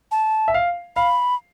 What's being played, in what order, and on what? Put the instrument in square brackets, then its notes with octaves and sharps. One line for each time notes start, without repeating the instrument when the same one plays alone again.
[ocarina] A5
[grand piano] E5
F5
[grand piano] F5 [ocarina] B5